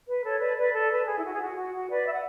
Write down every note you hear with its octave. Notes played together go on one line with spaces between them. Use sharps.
B4
A4 C#5
B4 D5
B4 D5
A4
B4
G#4
E4
F#4
G#4
F#4
F#4
F#4
B4 D5
E5
F#5